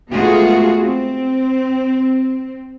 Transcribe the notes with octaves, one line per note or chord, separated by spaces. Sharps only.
G#3 A3 B3 F4 F#4 G#4
C4